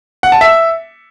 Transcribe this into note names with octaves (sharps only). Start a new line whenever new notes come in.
F#5
A5
E5